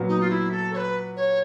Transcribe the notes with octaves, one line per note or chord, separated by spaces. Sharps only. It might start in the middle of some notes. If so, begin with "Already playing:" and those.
Already playing: A#2 F#3 B3
D#4
F4
E4
A4
C#5
B4
C#5